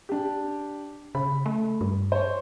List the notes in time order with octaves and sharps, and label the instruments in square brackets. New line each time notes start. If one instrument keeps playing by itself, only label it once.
[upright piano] D4 G4
[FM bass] C#3 [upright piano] B5
[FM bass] A3
G2
[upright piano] C5 C#5